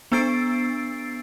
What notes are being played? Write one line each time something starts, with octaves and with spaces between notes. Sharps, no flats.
B3 D4 E6 A6 C7 D7